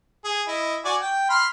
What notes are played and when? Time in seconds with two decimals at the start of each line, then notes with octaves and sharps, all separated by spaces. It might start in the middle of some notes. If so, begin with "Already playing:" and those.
0.25 G#4
0.48 E4 D#5
0.85 F#4 D5 G#5
1.02 G5
1.30 B5 C6 F6